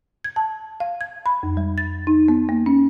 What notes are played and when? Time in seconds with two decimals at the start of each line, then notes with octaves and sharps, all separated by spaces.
0.24 G#6
0.36 A5
0.80 F5
1.01 G#6
1.26 B5
1.43 F2
1.57 G3
1.78 A6
2.07 D#4
2.28 B3
2.49 A#3
2.66 C#4